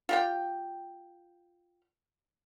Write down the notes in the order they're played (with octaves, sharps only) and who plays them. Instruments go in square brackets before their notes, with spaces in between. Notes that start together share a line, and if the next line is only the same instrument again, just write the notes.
[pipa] F4 G4 G5